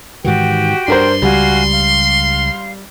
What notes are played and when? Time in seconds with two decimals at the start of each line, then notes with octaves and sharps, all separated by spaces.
0.24 G#2 D#3 E3 F#4 G4 G5
0.88 G2 D4 A#4 C5 C6
1.22 C#2 G3 F#4 F5 G#5
1.73 F5